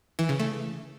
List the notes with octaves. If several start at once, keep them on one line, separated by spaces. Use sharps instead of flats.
E3
C#3
A3